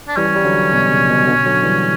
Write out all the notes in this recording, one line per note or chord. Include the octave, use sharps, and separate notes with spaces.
D4
E3 G3 C#4
G3
D3 F#3
B2
C#3
B2
B2 D3
D3 F#3
E3 G3